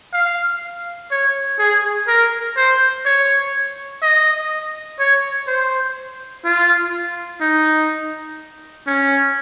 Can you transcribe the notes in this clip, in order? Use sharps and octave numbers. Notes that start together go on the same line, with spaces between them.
F5
C#5
G#4
A#4
C5
C#5
D#5
C#5
C5
F4
D#4
C#4